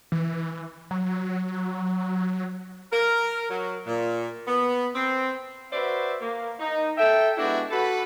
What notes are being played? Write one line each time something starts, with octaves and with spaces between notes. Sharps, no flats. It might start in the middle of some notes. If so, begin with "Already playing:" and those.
E3
F#3
A#4
F#3
A#2
B3
C4
F#4 B4 C5 D5 E5
A#3
D#4
A4 E5 G5
G#3 B3 D4 E4 F#4 G4
F#4 A4 B4